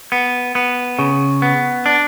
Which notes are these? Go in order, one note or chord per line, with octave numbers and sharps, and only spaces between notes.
B3
B3
C#3
B3
D4